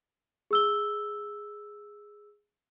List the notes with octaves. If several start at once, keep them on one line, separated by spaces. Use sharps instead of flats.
G#4 E6 G7